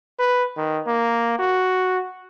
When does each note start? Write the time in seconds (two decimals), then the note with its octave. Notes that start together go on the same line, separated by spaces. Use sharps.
0.20 B4
0.57 D#3
0.87 A#3
1.39 F#4